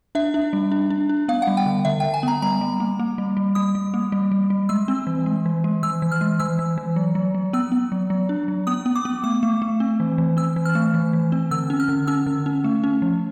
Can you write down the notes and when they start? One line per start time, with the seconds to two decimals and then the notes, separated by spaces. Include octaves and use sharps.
0.15 D4 E5
0.34 D4
0.53 G3
0.72 D4
0.90 D4
1.09 D4
1.28 B3 F5
1.42 F#5
1.47 G3
1.57 G5
1.66 D3
1.85 D3 E5
2.00 G5
2.04 D3
2.14 G#5
2.23 B3 A#5
2.42 G3 A#5
2.61 G3
2.80 A#3
2.99 A#3
3.18 G3
3.37 G3
3.55 G3 D#6
3.75 G3
3.94 A#3
4.12 G3
4.32 G3
4.50 G3
4.69 G#3 E6
4.88 C4
5.07 E3
5.26 G#3
5.46 E3
5.64 G#3
5.83 E3 E6
6.02 E3
6.12 F6
6.21 G#3
6.39 E3 E6
6.59 E3
6.78 E3
6.96 F#3
7.15 F#3
7.35 F#3
7.53 B3 E6
7.72 B3
7.92 F#3
8.10 F#3
8.29 D4
8.48 F#3
8.67 B3 D#6
8.86 B3
8.96 D6
9.05 B3
9.24 A3 D6
9.43 A3
9.62 A3
9.80 C4
10.00 E3
10.18 E3
10.37 C4 E6
10.56 E3
10.65 F6
10.75 A3
10.94 E3
11.13 E3
11.32 C4
11.51 D3 E6
11.70 C#4
11.80 F6
11.89 D3
12.07 C#4 E6
12.26 D3
12.46 C#4
12.64 A3
12.84 C#4
13.02 F3